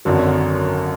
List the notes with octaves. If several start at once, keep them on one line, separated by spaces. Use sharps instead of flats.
G#1 F#2 D3 F#3